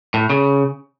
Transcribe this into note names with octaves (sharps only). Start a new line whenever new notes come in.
A2
C#3